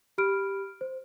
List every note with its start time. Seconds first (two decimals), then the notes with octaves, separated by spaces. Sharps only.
0.18 G4 B5 F6 D7
0.81 C5